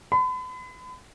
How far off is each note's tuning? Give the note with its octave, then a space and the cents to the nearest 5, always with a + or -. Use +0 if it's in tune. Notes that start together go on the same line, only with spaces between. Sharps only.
B5 +40